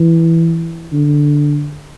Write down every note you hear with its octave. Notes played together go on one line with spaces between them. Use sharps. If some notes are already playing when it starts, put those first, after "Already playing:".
Already playing: E3
D3